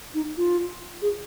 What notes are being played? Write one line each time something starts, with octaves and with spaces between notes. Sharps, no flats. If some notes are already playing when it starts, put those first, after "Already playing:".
D#4
F4
G#4